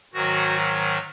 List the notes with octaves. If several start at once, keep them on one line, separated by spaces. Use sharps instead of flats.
G#2 D#3 F#3 F#4